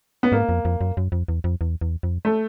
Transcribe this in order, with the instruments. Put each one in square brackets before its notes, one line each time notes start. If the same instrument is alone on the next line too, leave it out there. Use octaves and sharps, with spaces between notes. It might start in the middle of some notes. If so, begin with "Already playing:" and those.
[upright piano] B3
[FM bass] G#2 [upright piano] A#3
[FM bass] F2
F2
F#2
F#2
F2
E2
F2
E2
E2
F2
[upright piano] A3